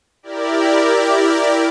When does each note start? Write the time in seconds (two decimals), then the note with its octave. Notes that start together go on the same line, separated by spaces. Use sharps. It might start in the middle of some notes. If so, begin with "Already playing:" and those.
0.23 E4 G4 A#4 D5